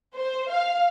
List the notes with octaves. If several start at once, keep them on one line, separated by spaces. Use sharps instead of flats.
C5
F5